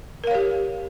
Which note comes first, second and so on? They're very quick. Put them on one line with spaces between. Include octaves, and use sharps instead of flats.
A#4 F5 C#5 G4